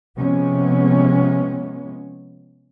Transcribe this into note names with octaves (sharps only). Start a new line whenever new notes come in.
C3 F3 G#3 B3 C#4